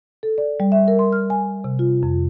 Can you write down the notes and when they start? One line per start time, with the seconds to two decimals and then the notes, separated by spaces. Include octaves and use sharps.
0.23 A4
0.38 D5
0.60 G3
0.72 E5
0.88 A#4
0.99 C6
1.12 F6
1.30 G#5
1.64 C3
1.79 F4
2.03 F2